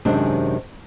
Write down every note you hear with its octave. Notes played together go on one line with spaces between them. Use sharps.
F#2 C3 D#3 G#3 C4 D4